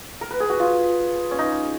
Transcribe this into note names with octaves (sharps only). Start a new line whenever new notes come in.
A#4
B4
G#4
F#4
F4
C#4
D#4